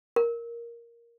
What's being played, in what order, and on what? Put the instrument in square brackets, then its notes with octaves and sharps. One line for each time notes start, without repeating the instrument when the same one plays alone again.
[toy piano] A#4